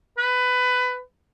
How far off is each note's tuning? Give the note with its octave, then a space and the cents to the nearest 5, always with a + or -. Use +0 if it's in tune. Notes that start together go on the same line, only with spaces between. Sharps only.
B4 +20